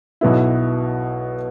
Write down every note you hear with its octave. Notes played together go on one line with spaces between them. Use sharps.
B1 B2 B3 E4